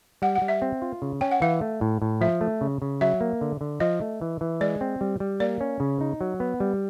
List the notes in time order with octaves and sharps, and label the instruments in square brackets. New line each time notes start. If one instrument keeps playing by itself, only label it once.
[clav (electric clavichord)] G3 [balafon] F#5
[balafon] F#5
[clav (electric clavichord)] G3
[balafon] E5
[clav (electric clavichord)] C4
F4
C#3
[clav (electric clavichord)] C#4 [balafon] G5
[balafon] F#5
[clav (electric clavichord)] E3 [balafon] F5
[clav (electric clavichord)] A3
A2
A2
[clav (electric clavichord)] F3 [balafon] E5
[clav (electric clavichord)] A3
C#3
C#3
[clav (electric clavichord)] F#3 [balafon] E5
[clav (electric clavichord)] A#3
D3
D3
[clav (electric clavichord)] F3 [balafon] D#5
[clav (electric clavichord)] A3
E3
E3
[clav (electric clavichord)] G#3 [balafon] D5
[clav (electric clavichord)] C4
G3
G3
[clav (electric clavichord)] A#3 [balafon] D5
[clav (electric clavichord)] C#4
C#3
D#4
F#3
B3
G3